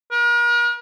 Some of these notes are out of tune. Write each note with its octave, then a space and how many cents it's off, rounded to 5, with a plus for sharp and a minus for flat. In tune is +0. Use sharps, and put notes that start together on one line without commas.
A#4 +40